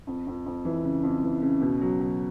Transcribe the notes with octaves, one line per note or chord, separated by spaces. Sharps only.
F2
F2
F2
E3
C#3
F2
E3
C#3
B2
F#3
F#3